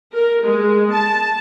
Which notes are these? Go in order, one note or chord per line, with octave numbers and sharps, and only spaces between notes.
A#4
G#3
A5